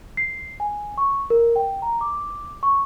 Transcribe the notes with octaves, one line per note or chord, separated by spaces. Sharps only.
C7
G#5
C#6
A#4
G5
A#5
D6
C#6